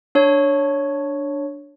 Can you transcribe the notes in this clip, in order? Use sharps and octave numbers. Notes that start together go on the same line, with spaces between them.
D4 C#5